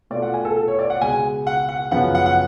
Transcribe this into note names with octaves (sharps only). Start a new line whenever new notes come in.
B2 A3 F4 D5
F#5
G#5
A4
A4
C#5
D5
F#5
C#2 B2 G#3 G#5
F#5
F#5
F#2 C#3 F3 B3 F#5
F#5
F#5